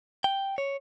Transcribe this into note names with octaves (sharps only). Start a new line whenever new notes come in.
G5
C#5